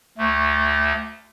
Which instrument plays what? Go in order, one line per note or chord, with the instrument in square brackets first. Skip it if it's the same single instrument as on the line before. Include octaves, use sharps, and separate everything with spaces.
[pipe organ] D2 A3